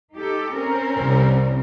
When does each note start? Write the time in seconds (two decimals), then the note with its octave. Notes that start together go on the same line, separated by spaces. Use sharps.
0.13 D#4 G4 A4
0.53 C4 C#4 A#4
0.98 C2